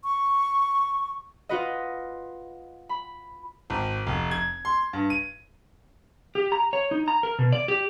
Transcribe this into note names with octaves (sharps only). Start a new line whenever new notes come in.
C#6
F4 F#4 B4 D#5
B5
G#1
F1
G#6
C6
G2
D#7
G4
A#5
C#5
D#4
A#5
A#4
B2
D5
G4